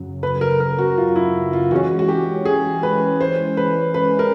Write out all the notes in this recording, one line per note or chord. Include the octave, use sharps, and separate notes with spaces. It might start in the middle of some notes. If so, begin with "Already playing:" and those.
Already playing: F#2 C#3 F#3
B4
A#4
A#4
F#4
F4
E4
F4
E3 G#3 C#4 F#4
F#4
G4
G#4
B4
C5
B4
B4
A#4